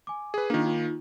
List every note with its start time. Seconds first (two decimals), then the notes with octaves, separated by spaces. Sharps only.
0.07 G#5 D6
0.34 G#4 B4
0.50 D#3 A#3 D4 F4
0.65 D#4 F4